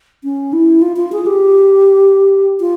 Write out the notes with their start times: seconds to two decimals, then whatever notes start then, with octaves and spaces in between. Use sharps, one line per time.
0.24 C#4
0.53 E4
0.82 F4
0.97 F4
1.12 G#4
1.26 G4
2.60 F4